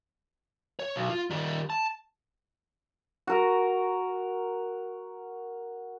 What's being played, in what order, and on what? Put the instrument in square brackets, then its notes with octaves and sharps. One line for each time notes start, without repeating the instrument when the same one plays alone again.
[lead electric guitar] C#5
B1
F4
D#3 G3
A5
[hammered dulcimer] F#4 A#4